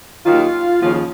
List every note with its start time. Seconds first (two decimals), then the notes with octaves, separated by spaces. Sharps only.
0.25 D#2 D#3 F#3 F4
0.82 D#2 C#3 F3 F4